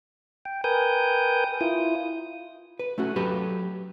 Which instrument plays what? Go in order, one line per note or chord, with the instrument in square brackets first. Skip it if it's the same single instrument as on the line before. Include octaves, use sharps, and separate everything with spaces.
[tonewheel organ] G5
A#4 B4 G5 G#5 D#6 G6
E4 F4 D#6
[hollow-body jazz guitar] B4
A3 C#4 F#4
F#3 G4 A4 B4